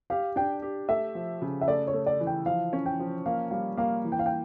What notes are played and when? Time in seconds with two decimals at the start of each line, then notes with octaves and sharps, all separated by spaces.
0.10 G4 F5
0.36 D4 G5
0.62 G4
0.88 A3 E5
1.15 F3
1.42 C#3
1.61 E5
1.68 A3 D5
1.87 C#5
1.93 A3
2.06 D5
2.20 E3
2.27 G5
2.46 F3 F5
2.73 C#4
2.86 G5
3.00 F3
3.26 A#3 F5
3.51 G3 F5
3.77 A#3 F5
4.04 E3
4.12 G5
4.19 F5
4.26 G5